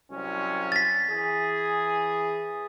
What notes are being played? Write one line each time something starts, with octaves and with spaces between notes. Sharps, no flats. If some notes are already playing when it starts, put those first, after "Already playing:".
C2 F#3 C#4
A6 B6
E3 G#4